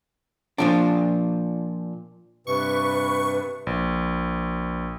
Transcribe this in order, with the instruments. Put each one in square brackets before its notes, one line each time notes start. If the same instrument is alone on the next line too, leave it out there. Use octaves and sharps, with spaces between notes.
[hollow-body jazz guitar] A#2 F3 D4
[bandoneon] G2 C3 [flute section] B4 [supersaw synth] C#6
[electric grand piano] A#1